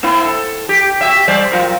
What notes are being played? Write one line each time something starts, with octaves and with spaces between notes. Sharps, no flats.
A#3 C4 E4
A4
G4
F#4 G4 E5
G3 C5 D5
F#3 F4 A#4